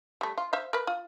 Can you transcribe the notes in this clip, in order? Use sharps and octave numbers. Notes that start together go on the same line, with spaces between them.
G3 A3
F4
C5 E5 F5
A#4 B4
F4